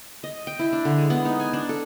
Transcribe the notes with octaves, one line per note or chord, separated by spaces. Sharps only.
D#5
G5
E4
D4
D3
G#3
B3
D#4
G#5
D4
A4